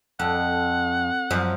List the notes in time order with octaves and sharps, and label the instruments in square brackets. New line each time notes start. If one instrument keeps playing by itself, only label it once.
[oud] F2 [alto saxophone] F#5
[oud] F#2 F3